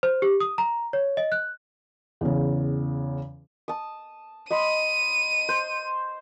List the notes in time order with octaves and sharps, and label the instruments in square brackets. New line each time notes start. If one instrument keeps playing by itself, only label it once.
[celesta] C5
G4
D#6
A#5
C#5
D#5
F#6
[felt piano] E2 C#3
[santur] A5 D#6
[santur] D#5 B5 C6 [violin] D#7
[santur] C5